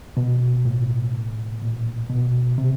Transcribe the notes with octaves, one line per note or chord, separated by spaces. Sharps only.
B2
A2
A#2
B2
C3